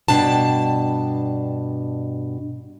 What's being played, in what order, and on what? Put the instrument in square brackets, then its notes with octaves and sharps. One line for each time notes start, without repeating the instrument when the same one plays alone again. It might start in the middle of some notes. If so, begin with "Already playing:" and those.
[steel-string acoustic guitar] G2 B2 D4 G5 A5